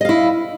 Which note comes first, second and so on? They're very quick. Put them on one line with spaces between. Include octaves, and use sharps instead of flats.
D#5 F5 E4